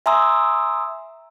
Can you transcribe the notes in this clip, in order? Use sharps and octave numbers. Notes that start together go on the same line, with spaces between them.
E5 G#5 A#5 C6 D#6 E6